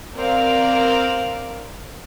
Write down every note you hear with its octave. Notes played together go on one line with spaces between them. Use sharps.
C4 A#4 D5 F5